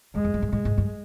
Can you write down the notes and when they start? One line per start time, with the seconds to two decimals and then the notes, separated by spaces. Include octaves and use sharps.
0.15 E2 G#3
0.25 F2
0.34 F#2
0.42 G#2
0.52 A2 G#3
0.65 G#2
0.78 G2